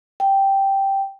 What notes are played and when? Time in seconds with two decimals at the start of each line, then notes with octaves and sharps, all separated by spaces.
0.20 G5